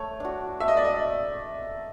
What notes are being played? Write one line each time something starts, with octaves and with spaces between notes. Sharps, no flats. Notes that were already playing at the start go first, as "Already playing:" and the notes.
Already playing: A3 C#5
D4 F#4
A3 E5
D#5
D5
D#5